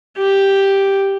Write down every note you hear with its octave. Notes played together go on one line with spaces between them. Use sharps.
G4